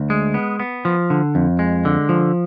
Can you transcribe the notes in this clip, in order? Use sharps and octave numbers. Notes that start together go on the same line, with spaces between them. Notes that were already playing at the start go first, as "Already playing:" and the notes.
Already playing: D2
G#3
B3
B3
F3
D3
F2
G#3
D3
F3